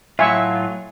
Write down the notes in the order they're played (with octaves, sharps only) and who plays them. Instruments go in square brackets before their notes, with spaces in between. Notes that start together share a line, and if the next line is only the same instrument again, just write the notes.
[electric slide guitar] A2 F#3 F4 [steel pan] E5 G#5 C#6